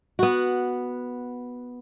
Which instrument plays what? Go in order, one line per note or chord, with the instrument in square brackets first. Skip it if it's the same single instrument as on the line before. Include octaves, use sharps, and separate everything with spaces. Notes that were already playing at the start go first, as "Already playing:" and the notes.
[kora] B3 F#4